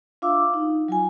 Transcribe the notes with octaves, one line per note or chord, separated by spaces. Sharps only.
D4 F4 E5 F5 D6 E6
D#4
F#3 F4 G#5